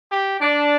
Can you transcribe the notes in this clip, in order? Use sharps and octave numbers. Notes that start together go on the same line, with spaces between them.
G4
D4